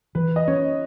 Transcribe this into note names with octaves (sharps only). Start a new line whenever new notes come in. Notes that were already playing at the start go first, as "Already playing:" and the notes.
E3 B4
D#5
C#4 C#5